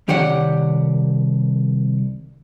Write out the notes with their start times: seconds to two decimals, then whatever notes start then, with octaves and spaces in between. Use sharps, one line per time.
0.08 C2 D#3 G4 C#5 D5 F#5